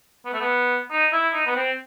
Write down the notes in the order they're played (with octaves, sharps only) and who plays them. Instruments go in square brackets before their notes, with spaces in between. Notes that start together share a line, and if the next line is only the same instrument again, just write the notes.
[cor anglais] B3
A3
B3
D#4
E4
D#4
B3
C4